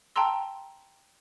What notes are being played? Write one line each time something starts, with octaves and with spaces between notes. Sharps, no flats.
G5 A5 A#5 C6 E6